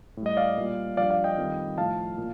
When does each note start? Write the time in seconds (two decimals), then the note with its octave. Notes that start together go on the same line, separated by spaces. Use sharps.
0.17 A2
0.22 G3 D#5
0.37 D5 F5
0.57 A#2 G3
0.97 G2 F3 D5 F5
1.11 D5 F5
1.24 D#5 G5
1.38 F2 D#3 G3
1.77 A2 F3 F5 A5
2.18 A#2